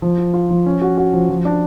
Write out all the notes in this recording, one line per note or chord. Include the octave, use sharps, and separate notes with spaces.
F3
F4
F4
F3
C#4
F#4
F#4
F3
F3
D4